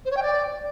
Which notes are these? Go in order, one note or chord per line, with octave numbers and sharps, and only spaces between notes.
C5
C#5
G5
D5